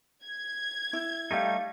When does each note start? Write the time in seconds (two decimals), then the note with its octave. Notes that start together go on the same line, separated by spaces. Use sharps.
0.25 G#6
0.93 E4
1.31 G3 A3 D#4 G4 F5